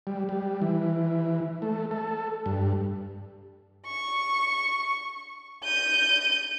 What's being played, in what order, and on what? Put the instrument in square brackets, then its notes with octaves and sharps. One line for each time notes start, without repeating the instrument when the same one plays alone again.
[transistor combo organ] G3
G3
E3
A3
A4
G2
[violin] C#6
G6 D#7